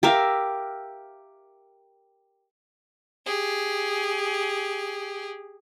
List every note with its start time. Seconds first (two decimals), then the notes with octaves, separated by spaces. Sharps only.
0.03 G4 A#4 E5 F5
3.25 G4 G#4